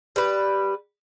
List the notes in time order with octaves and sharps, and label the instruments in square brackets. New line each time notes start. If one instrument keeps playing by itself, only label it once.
[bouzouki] G3 B4